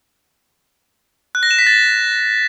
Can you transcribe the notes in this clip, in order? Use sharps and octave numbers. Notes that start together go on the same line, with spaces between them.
F#6
A#6
E7
B6
A6